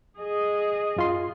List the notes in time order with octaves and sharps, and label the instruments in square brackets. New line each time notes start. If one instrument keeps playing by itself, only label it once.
[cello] G#4 D#5
[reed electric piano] F#2 F4 C6